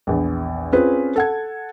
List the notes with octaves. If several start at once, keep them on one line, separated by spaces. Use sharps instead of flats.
A#1 E2
C4 C#4 F4 G#4 B4
A4 F#5 G#6